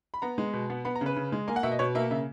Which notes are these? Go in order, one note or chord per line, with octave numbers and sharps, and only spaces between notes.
B5
B3 A#5
G#3
B2
B3
B3 B5
A#5
C#3 B4
C#3
G#3
A#3 G#5
F#5
B2 E5
D#5
B2 C#5
A#3 E5
C#3 E5